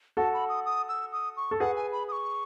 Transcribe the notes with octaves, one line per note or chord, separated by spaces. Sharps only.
F#4 A4 A5
B5
D#6
D#6
E6
D#6
C#6
A4
G#4 B4 F#5
G#5
B5
D#6
C#6